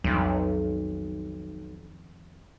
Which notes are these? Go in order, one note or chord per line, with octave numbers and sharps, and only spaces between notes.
B1 F2 D#3